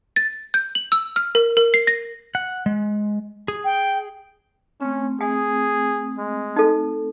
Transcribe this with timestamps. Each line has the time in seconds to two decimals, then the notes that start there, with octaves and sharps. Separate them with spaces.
0.16 A6
0.54 G6
0.75 F#7
0.92 E6
1.16 F6
1.35 A#4
1.57 A#4
1.74 C7
1.87 A#6
2.35 F#5
2.66 G#3
3.48 G#4
3.64 G5
4.81 A3 C4 C#4
5.21 G#4 G#5
6.18 G#3
6.56 D#4 A4